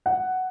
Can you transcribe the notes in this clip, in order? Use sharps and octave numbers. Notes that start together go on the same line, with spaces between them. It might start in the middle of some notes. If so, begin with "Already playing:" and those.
F#5